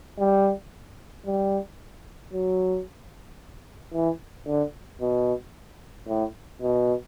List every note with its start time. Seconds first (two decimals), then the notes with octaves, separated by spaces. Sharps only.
0.19 G3
1.26 G3
2.33 F#3
3.93 E3
4.47 D3
5.01 B2
6.08 A2
6.61 B2